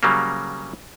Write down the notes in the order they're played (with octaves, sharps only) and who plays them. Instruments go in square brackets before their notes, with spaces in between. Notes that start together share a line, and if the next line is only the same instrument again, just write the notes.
[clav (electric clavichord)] C#3 F#3 G3 A#3